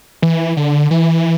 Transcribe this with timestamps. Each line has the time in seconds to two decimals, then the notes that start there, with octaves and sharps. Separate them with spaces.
0.22 E3
0.57 D3
0.91 E3